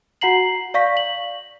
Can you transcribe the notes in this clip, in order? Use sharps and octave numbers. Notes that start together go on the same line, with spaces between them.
F#4 F#5 A#5 C7 F#7
D5 F5 C#6 B6
F#7